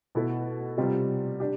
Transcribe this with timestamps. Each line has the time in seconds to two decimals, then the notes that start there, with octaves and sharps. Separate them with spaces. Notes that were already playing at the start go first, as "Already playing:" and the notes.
0.15 B2 B3 E4 A4
0.77 C3 G3 C4 F4
1.40 D4 G4